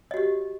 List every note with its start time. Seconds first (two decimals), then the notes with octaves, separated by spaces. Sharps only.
0.11 D#5
0.14 F#4
0.17 G4